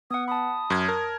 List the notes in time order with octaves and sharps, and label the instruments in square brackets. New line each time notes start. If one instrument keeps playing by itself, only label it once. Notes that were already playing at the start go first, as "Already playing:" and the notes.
[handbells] B3 F#5 [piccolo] D#6
[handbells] A5 B5 [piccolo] D#6
[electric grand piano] F#2 G#6
[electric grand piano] A#4 [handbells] A5